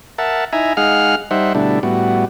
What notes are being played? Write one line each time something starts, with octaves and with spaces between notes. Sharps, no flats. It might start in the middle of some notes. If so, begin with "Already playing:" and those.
A#4 E5 F#5 A5
D#4 E4 E5 G#5 A#5
G#3 D#4 G#4 F5 F#5 F6
G3 D#4 C5 E5 F#5
B2 D3 G3 A3 D4 E4
A2 G3 B3 F#4